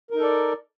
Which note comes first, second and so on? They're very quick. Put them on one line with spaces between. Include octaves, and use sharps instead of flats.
A#4 D#4 A4 D5